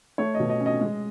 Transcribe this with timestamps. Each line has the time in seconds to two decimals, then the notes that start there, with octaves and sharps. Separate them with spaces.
0.18 A3 C#5
0.35 B2 D#5
0.50 D#5
0.60 C#4
0.66 D#5
0.81 G#3